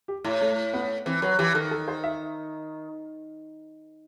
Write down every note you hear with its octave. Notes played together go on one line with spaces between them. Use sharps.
G4
A2 E4
A3
B3
E3 C4
F#3 B4
E3 G4
D#3 A4
A4
C5
E5